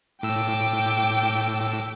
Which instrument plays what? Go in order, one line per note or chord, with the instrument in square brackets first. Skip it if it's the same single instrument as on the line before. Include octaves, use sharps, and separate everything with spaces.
[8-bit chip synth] A2 E6 [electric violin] G5 D6